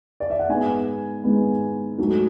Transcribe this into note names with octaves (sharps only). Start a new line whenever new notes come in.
D5
E5
F#5
G#2 G#3 B3 G#5
G#2 G#3 B3
G#2 F#3 A3